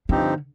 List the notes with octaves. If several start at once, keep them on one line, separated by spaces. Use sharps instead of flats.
G2 D3 F3 C4 D#4 G4